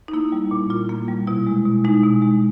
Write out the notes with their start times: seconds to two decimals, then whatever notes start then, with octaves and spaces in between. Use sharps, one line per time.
0.08 D#4
0.13 A#3 E4
0.32 G3
0.51 A#2
0.70 A#2 F4
0.89 A#3
1.08 G3
1.27 B2 E4
1.47 G#3
1.66 B2
1.84 G#3 D#4
2.03 B2
2.22 G#3